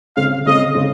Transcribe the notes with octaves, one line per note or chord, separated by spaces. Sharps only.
C#3 G#3 C4 F5
C#3 G#3 C4 D#5
C#3 G#3 C4